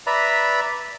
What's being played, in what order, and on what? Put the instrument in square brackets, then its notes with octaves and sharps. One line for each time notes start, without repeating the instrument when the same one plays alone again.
[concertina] B4 D5 E5 A#5 B5